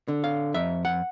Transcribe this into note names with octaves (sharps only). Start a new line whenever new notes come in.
D3
F5
F2 E5
F#5